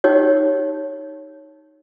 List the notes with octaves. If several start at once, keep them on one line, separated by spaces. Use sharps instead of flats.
D#4 G4 C#5